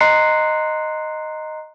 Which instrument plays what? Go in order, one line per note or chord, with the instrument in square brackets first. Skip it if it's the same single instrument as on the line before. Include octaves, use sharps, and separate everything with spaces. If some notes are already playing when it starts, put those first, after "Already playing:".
[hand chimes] D#5 A#5 C6 F#6 C7 C#7